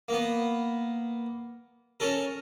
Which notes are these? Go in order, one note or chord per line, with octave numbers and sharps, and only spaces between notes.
A#3 B3
C#4 A4 A#4